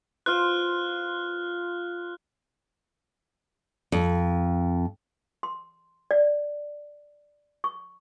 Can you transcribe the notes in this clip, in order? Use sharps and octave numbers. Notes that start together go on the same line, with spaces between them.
F4 C5 F6 F#6
F2
C6
D5
C#6